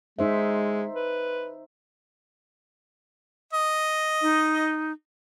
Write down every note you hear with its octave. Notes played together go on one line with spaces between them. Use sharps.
G#3 D#4 C5 E5
B4
D#5
D#4